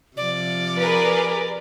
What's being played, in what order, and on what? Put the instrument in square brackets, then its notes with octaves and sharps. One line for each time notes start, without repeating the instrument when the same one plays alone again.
[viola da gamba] C3 F3 [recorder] D5
[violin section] G#4 A#4 B4